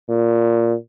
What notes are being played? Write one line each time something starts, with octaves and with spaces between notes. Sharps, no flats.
A#2